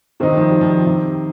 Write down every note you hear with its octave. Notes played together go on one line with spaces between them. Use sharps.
C3 D#3 C4 D#4
F3
G3
F3
C3